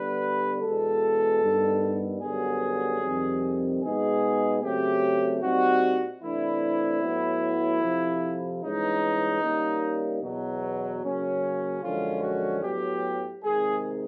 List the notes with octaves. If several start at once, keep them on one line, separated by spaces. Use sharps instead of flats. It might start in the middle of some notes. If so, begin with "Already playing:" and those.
Already playing: D3 G3 B3 D4 B4
E2 B2 G#3 A4
G2 D#3 G3 B3
F#2 D3 G3 B3 G#4
F2 C3 D#3 G3 C4
B2 G#3 B3 D#4 G#4
C#3 F#3 A3 C4 G4
A#2 G3 C4 D#4 F#4
C3 E3 A3 D4 E4
A2 F#3 B3
F2 C3 F3
G2 E3 G#3 C#4 D#4
D#3 G3 A#3 C#4
E2 B2 F#3
C#3 F#3 A#3 C#4
F#2 D3 F3 G#3 C#4 F4
F#4
A2 F#3 B3 G4
C3 D#3 G#3 G#4